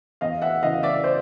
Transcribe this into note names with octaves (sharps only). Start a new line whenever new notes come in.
E2 D#5 F5
E5 F#5
C#3 E3 D#5 F5
D5 E5
C5 D5